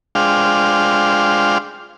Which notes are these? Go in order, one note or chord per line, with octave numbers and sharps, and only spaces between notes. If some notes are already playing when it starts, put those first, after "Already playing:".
G#3 D4 F4 C5 F5 G5